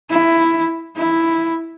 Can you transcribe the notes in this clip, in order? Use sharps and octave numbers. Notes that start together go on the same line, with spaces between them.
E4
E4